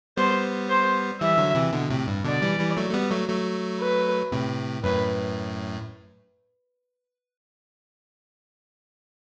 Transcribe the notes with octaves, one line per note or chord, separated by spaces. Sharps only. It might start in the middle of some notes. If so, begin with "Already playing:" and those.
G3 B3 C5
C5
E3 G3 E5
D3 F#3
C3 E3
B2 D3
A2 C3
G2
B2 D3 D5
E3 G3
E3 G3
F#3 A3
A3
G3 B3
F#3 A3
F#3 A3
B4
A2 C3
F#2 A2 B4